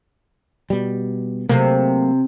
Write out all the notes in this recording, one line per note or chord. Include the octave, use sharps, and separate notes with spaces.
B2 G3
C3 F#3 A3 A#3